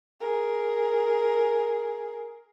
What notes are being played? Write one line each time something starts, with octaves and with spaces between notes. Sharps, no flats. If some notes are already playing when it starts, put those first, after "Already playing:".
G#4 A#4